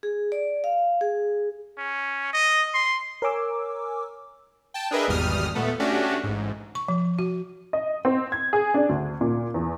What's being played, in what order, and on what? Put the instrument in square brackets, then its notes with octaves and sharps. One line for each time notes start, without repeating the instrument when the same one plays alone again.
[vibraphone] G#4
D5
F5
G#4
[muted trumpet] C#4
D#5
C6
[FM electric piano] A#4 C#5 G#5 D6 E6
[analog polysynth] G5 A5
D4 G#4 A#4 B4 D#5 E5
G#1 E2 B2 G3 D#6 F6
A#2 A3 B3 A4
A3 C#4 D4 F#4 G4
A1 G#2
[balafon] C#6
F3
F#4
[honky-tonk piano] D#5
C4
G#6
G#4
D4
D2
A#2
E2